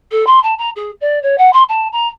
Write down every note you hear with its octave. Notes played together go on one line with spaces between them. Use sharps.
A4
C6
A5
A#5
G#4
D5
C#5
F#5
C6
A5
A#5